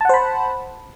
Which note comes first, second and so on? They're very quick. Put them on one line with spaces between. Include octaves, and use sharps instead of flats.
A5 F#5 C5 B5